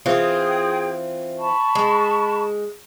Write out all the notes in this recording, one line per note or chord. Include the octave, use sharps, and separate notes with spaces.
E3 C4 F4 G#4 G5 D#6
A5 B5 C#6
G#3